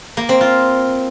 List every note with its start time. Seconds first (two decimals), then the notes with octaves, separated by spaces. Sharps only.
0.17 A#3
0.29 C4
0.41 F4